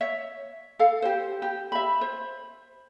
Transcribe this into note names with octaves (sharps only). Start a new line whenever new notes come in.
C#5 E5
A4 F5
G4 C5
G4
E5 B5
C5